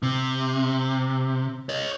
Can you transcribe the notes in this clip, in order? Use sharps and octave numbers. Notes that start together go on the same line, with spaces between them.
C3
C#5 D#5